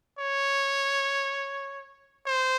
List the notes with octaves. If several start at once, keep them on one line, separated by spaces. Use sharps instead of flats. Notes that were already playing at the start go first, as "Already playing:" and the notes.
C#5
C5